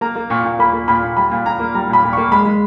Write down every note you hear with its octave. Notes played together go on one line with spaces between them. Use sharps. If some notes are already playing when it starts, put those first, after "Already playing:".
A#3 A#5
A#3
A#2 C#6
A#2
A#3 B5
A#3
A#2 B5
A#2
G3 B5
A#2
A#2 A#5
A#3
G3 A#5
A#2 B5
A#2
A#3 C#6
G#3 B5
G#3